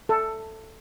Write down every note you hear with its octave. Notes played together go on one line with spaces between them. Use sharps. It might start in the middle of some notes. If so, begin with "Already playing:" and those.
A4